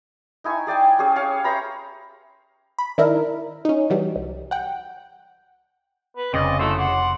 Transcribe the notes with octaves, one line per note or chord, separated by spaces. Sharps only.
D#4 E4 G#5 C#6
G#4 D5 G5 G#5
C#4 G4 G#4
C#4 C#5 F5
C5 E5 A#5 B5
B5
D#3 D4 E4 A#4
C#4 D#4
E3 F#3 G3
C2
F#5 G5
B4
F1 C#3 C4 D5 D#5
A3 E4 F#4 C5
F#5 C6 D6